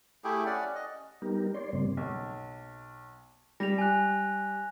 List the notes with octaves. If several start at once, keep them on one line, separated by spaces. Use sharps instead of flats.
A3 E4 G4 G#4
C#4 D5 F#5
D#5
G3 B3 D#4 G4 A#4
C#5 D5 C6
G2 C#3 G3 A#3 C4
B1
G3 A#6 F7
G#5 F#6